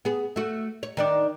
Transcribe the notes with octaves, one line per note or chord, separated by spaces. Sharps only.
B3 G#4
A3 F#4
C#5
D#3 D4 D5